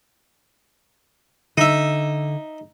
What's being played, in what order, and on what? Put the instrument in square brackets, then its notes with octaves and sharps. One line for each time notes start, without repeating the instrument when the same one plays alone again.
[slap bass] D3 [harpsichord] D#4 E5